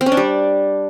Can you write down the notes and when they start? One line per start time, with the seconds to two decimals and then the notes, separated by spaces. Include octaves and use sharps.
0.01 C4
0.06 C#4
0.12 D4
0.17 G3